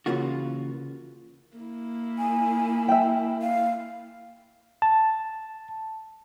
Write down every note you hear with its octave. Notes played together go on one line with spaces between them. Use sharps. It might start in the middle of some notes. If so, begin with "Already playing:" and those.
C#3 E3 A#3 F4 F#4
A#3 E4
G#5
E5 G5
F5
A5